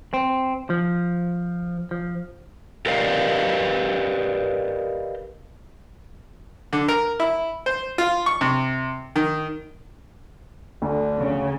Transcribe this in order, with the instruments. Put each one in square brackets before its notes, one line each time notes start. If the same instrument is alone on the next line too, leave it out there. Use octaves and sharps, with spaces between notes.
[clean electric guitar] C4
F3
F3
[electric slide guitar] G4 A#4 B4 D5 D#5 F5
[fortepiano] D3
A#4
E4
C5
F4
C#6
C3
D#3
[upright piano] D2 [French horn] D3
[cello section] C#3